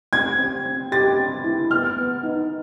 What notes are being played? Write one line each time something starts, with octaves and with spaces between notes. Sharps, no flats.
C4 G#6
C4
C4
G4 A6
C4
E4
B3 F6
B3
D#4